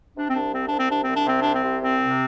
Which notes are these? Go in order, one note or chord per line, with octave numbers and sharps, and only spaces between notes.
C3 D4
C4
C2 D4
C3 C4
D4
C2
C4
C3 D4
C4
C2
D4
C3 C4
C2 D4
C4
C3
C2 C4
C3